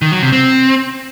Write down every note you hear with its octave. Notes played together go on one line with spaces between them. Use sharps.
D#3
F#3
C3
C4